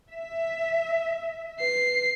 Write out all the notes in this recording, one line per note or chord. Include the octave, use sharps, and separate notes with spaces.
E5
B4 C7